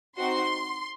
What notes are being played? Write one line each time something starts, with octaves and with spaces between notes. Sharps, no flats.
C4 D#4 F#4 C6